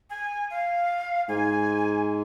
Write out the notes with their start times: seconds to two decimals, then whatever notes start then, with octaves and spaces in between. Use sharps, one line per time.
0.10 G#5
0.50 F5
1.29 G#2 G#5